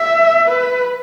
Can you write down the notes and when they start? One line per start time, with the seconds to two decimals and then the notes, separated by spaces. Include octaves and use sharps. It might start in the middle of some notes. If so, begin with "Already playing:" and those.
Already playing: E5
0.48 B4